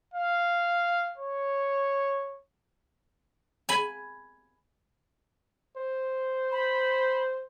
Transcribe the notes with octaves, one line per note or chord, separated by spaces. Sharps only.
F5
C#5
G#5 B5
C5
B5